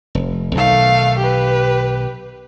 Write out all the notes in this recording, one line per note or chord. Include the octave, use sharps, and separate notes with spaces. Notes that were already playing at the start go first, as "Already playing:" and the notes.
F1
B1 D#3 A3 F5
G4 B4